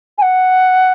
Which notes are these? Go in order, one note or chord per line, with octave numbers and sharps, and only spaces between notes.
G#5
F#5